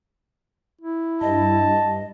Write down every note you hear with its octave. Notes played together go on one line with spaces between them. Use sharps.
E4
G2 D#5 A5